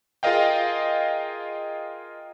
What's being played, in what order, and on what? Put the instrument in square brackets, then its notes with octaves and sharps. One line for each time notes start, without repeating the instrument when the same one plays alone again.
[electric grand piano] F4 G#4 A#4 D#5 F5 G5